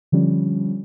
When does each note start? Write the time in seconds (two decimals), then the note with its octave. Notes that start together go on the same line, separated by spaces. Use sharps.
0.12 D3 F3 G3 C#4